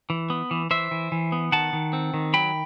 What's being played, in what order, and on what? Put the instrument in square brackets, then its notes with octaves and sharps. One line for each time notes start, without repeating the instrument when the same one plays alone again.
[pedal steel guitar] E3
B3
E3
E3 C5 E5
E3
E3
B3
D#3 F#5 A5
D#3
C4
D#3
F#3 G5 B5